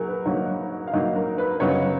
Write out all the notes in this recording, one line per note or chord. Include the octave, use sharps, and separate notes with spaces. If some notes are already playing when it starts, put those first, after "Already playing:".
Already playing: F#3 A#3 D#4 G#4 A#4
B4
G#2 F#3 A#3 D#4 C#5
F5
G#2 F#3 A#3 D#4 D#5
A#4
B4
F#2 C#3 F#3 B3 D#4 C#5